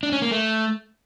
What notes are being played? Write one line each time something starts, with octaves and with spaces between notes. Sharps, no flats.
D4
C#4
A#3
A3